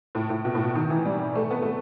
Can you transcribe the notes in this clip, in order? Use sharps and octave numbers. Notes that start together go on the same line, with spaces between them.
A2
A2
B2
A2
B2
D#3
E3
G3
A3
B3
A3